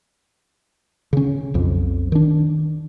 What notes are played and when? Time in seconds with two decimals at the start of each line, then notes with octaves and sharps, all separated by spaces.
1.13 C#3 C#4
1.54 B1 F2
2.12 D#3 D4